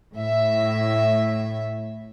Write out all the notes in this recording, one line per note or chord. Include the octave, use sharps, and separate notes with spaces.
A2 E5